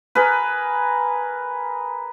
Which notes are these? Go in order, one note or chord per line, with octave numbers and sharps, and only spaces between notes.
G#4 A#4 B4